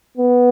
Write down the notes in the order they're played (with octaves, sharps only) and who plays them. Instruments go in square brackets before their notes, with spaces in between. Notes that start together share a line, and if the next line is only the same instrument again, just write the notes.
[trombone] B3